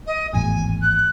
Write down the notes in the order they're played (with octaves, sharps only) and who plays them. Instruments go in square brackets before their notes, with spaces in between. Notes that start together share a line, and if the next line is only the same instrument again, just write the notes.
[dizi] D#5
[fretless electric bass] G#1 E2 A2 [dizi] G#5
[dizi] F#6